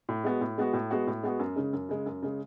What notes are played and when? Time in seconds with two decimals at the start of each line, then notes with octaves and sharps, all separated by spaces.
0.09 A2
0.24 G#3 B3 F#4
0.41 A2
0.58 G#3 B3 F#4
0.73 A2
0.91 G#3 B3 F#4
1.07 A2
1.23 G#3 B3 F#4
1.39 F#2
1.56 C#3 G#3
1.73 F#2
1.89 C#3 G#3
2.06 F#2
2.22 C#3 G#3